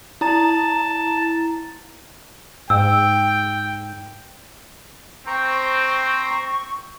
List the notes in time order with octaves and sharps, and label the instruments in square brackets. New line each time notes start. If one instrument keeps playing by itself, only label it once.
[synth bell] E4 A#5 [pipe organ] A5
[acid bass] G#2 [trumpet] G5 [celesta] E6
[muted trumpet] C4 [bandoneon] C5 G5 A#5 [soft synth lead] C#6